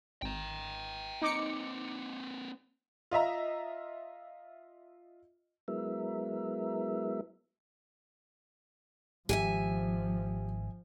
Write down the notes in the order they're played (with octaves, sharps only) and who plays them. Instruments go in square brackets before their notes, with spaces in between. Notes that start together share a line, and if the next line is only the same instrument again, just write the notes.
[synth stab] G#1 [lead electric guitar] G5 A#5
[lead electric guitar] A#3 C4 [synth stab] D#4 D6 C#7
[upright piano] F4 D#5 E5 A#5
[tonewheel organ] F#3 G#3 B3 E4 A#4 E5
[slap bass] G#1 [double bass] F3 [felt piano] G4 [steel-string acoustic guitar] E5 G5 G#5